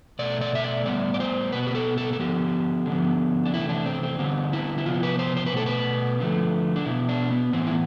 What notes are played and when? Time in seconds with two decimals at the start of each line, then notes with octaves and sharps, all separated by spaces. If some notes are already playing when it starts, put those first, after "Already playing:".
0.19 B2 A3 D5
0.41 D5
0.55 E5
0.64 D5
0.86 A2 G3 B3 D5
1.14 D5
1.20 C5
1.53 B2 B3 B4
1.67 G4
1.75 A4
1.98 A4
2.13 A4
2.19 D3 F3 B3 G4
2.86 D3 F3 B3
3.46 D4
3.53 C3 E3 A3 E4
3.69 D4
3.86 C4
4.03 C4
4.19 D3 G3 B3 C4
4.53 E4
4.78 E4
4.86 C3 F3 B3 F4
5.03 B4
5.19 C5
5.37 C5
5.46 B4
5.53 B2 A3 A4
5.66 B4
6.20 D3 F3 A3
6.76 D4
6.85 B2 E4
6.91 B3
7.09 D4
7.31 B3
7.52 A2 E3 B3 C4
7.67 E4